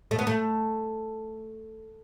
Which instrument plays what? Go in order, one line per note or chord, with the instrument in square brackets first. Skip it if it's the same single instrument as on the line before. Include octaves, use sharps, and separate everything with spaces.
[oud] A3
B3
A3